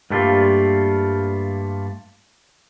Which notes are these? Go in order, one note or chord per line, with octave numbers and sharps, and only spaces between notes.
G2 G3 A3 A#3 F4